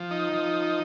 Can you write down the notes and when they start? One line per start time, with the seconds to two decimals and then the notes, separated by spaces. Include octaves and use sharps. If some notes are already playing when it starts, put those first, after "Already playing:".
Already playing: F3
0.11 D#4
0.33 F3